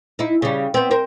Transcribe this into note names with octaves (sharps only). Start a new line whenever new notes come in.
D#4 E4
C#3 G3
B3 C4
A#4 C5